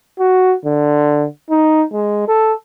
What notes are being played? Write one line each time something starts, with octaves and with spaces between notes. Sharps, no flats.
F#4
D3
D#4
G#3
A4